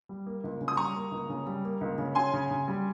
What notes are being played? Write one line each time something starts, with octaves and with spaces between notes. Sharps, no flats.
G3
A#3
C#2
C#3
D#6
G3 A#5 C#6
A#3
C#2
C#3
G3
A#3
C#2
C#3
C#4 G#5 C6
C#3
C#3
G3